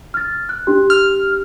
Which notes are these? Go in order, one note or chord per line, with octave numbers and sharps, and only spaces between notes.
F6 A6
F#6
D4 G4
F6